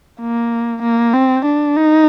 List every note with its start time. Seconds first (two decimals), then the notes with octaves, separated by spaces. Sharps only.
0.21 A#3
0.83 A#3
1.14 C4
1.45 D4
1.76 D#4